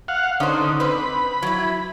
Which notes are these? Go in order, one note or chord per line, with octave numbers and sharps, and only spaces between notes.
F5 F#5
D3 C#4 D#4 C5
C4 B4 B5
F#3 E4